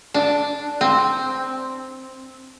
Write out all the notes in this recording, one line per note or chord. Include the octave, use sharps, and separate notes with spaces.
D4
C4